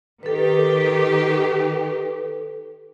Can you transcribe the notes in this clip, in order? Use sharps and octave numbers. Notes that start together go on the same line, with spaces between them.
D#3 G4 A4 B4